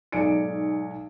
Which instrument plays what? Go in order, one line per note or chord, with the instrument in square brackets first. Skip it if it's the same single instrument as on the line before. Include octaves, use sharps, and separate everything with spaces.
[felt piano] B1 G#2 D5 G#5 C#7 D7